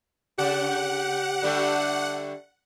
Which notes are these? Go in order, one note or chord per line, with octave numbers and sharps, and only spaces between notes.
C#3 G4 F#5
D3 G3 A3